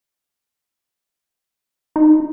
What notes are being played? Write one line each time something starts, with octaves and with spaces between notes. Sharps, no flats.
D#4